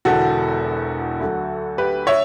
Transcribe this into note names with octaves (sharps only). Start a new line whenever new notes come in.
E1 E2 D3 F#4 A4
D2 D3 F#3
G4 B4
C#5 E5